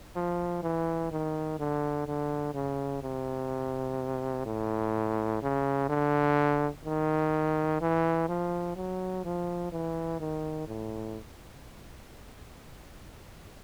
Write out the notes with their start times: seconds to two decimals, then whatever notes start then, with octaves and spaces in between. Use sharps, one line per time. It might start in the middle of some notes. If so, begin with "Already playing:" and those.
0.16 F3
0.63 E3
1.11 D#3
1.59 D3
2.07 D3
2.55 C#3
3.02 C3
4.46 A2
5.42 C#3
5.89 D3
6.85 D#3
7.81 E3
8.29 F3
8.76 F#3
9.25 F3
9.73 E3
10.20 D#3
10.68 A2